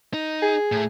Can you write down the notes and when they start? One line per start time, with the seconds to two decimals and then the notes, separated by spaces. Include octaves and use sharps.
0.14 D#4
0.42 G#4
0.72 A2 A3